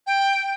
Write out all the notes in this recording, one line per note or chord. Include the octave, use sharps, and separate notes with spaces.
G5